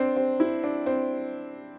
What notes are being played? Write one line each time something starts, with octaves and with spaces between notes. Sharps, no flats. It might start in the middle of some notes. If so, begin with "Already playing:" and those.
Already playing: C4 D4
C4
E4
D4
C4